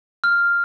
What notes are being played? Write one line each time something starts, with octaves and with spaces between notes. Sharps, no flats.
F6